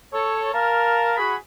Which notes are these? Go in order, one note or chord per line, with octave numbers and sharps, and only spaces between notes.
A4 C#5
A#4 F5 A5
F#4 G#4 B5